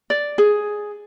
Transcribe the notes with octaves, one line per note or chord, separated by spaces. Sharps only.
D5
G#4